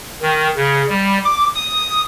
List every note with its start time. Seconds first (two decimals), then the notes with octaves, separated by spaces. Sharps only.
0.22 D#3
0.56 C#3
0.89 G3
1.25 D6
1.55 D#6